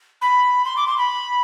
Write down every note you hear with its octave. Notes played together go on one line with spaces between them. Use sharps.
B5
C6
D6
C6
B5